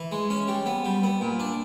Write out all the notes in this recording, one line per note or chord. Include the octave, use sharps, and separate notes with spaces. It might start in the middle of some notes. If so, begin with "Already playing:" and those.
Already playing: E3
G#3
C#4
G3
B3
G3
B3
A#2
D4